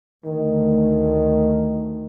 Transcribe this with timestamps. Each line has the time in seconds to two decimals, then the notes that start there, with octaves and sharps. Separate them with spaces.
0.25 D2 D#3